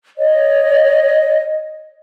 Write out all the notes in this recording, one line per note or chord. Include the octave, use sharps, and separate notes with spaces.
C#5 D#5